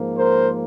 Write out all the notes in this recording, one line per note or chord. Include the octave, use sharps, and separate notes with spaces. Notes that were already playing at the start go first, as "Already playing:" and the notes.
Already playing: G#2 F3 A#3
A#4 C5